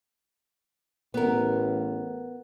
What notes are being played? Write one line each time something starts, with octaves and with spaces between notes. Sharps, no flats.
A1 B3 A#4